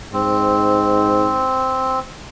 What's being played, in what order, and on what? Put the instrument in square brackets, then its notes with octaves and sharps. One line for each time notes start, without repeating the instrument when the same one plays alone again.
[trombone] G#2 [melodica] C4